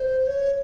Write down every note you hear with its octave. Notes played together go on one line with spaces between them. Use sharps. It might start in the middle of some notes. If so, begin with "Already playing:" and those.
Already playing: C5
C#5